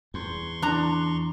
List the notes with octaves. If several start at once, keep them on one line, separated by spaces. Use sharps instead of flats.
E2 C6 C#6
E3 D4 A#5